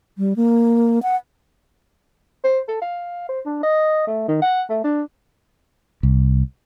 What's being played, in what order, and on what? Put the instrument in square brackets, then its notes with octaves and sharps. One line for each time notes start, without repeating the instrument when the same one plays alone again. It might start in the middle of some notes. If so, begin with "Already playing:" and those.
[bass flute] G3
A#3
F#5
[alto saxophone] C5
A4
F5
C5
D4
D#5
A3
D#3
F#5
A3
D4
[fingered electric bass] C2